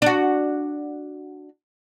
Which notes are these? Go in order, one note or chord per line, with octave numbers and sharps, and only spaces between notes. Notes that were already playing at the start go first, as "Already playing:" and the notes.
D4 F#4